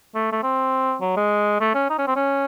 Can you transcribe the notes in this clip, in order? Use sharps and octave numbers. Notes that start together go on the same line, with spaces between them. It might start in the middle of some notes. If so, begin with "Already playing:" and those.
A3
A3
C4
F#3
G#3
A3
C#4
D#4
C#4
C4
C#4